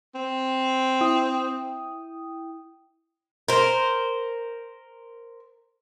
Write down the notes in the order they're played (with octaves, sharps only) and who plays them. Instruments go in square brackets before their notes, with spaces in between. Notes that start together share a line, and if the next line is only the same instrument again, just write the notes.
[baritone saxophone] C4
[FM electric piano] E4 G5 D#6
[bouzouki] A#4 C5